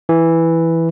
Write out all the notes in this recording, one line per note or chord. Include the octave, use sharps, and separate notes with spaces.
E3